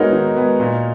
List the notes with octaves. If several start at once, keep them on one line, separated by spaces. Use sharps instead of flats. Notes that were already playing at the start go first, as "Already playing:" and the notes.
Already playing: G#3 B3 D#4 F#4 A#4 C#5
D#3
G#3 B3
A#2